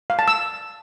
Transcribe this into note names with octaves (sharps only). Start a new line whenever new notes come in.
F5
A5
E6